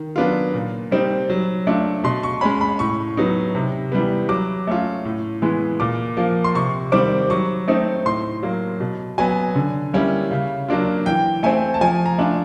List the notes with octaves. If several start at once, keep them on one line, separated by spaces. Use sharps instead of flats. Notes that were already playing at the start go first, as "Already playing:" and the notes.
Already playing: D#3
F#3 B3 D4 F4
A#2
G3 C4 D#4
F#3
A3 D4 F4
B2 C6
C#6
G#3 C#4 B5
B5
A2 C#6
F#3 B3 D#4
C3
E3 G3 B3
F#3 D6
A3 C#4 F4
A2
E3 G#3 B3
A#2 D6
F3 A#3
C6
C3 C#6
D#3 G3 C4 D6
F#3 C#6
A3 C4 D#4
A2 C6
F#3 A#3
B2
F#3 B3 G#5
D3
G3 A#3 C#4 E4
C#3
F#3 A#3 D4 F4
E3 G5
A3 C4 G#5
A5
F3 G#5
A#5
A3 D4 F4